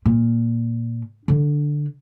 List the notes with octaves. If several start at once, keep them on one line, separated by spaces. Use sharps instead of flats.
A#2
D3 D4